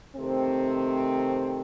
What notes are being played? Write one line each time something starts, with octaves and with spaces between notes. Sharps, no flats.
C3 D#3 A3 C4